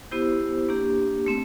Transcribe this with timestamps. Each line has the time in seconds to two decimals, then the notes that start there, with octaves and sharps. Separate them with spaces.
0.11 B3 E4 G4 C5
0.69 A#3 D4 G4
1.26 A3 C4